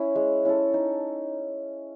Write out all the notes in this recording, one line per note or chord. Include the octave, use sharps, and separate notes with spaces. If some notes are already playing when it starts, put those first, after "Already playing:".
Already playing: C#4 E4
G#3
C#4 E4 A4
D#4